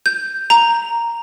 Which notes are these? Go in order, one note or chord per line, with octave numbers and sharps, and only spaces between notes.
G6
A#5